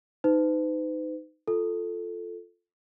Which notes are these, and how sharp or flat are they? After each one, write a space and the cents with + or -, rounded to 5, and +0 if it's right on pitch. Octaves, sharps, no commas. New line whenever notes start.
D#4 +0 B4 +45
F4 +0 A4 +0